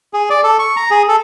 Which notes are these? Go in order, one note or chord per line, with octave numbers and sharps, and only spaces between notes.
G#4
D5
A4
C#6
A#5
G#4
A4